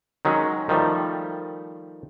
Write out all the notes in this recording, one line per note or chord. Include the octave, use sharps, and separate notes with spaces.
D#3 F#3 G#3 C#4
D#3 F3 G3 A3